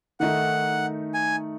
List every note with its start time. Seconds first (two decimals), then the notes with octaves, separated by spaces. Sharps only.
0.20 D#3 A3 D#4 F#5
1.14 G#5